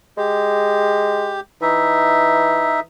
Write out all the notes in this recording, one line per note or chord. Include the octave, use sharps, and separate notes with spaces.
G#3 G4
E3 D#4 E5